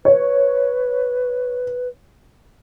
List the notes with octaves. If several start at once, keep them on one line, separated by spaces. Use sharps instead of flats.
B4 C#5